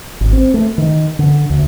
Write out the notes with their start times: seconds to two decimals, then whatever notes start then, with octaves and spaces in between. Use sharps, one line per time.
0.21 G#1
0.33 C4
0.54 A3
0.78 D#3
1.19 D3
1.50 D2